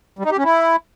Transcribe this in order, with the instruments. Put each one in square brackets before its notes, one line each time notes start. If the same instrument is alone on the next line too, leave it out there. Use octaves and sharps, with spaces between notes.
[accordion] G3
D#4
G4
C#4
E4